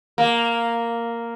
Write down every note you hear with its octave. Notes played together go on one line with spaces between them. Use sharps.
A#3